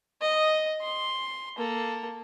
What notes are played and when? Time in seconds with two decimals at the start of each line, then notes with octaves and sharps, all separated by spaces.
0.21 D#5
0.82 C6
1.57 A#3 A4